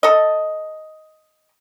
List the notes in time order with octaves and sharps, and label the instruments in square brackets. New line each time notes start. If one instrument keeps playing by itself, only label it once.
[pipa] A4 D#5